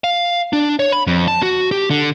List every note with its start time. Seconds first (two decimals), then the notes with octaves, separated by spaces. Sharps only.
0.04 F5
0.53 D4
0.79 C#5
0.92 B5
1.07 F2
1.28 A5
1.43 F#4
1.71 G4
1.90 D3